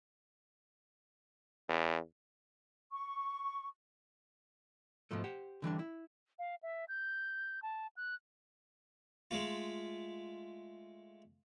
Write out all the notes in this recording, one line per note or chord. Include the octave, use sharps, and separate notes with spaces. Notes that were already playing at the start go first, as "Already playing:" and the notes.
E2
C#6
G#2 B2 F3 A3
G4 C5 F#5
D3 E3 G3 D4
E4
F5
E5
G6
A5
F#6
G#3 A3 F4